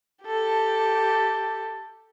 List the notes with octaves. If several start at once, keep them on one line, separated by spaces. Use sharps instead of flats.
G4 A4